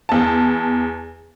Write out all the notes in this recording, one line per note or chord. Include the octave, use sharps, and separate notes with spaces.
E2 A5